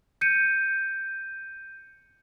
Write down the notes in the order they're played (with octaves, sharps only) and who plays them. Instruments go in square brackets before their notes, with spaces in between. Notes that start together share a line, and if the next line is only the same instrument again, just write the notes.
[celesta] G6 C#7 D#7